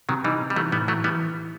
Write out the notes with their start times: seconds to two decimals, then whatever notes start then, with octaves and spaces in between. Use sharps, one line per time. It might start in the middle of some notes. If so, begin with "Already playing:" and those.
0.09 C3 D#3 F#3
0.24 E3 G3 D#4
0.41 C3
0.50 G3
0.56 E3 F#3 A3
0.72 A2 G3 B3
0.88 E3 F#3 A3
1.04 E3 G3 B3